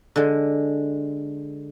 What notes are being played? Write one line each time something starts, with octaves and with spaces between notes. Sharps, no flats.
D3 G#3